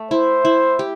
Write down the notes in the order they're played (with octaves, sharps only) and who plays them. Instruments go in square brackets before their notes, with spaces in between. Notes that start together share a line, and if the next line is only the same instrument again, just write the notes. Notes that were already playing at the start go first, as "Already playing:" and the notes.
Already playing: [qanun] A3
[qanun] E4 [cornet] C5
[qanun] E4
G4